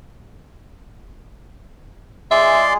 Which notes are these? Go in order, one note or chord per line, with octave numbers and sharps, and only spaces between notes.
G#3 F4 G#4 D5 E5 C6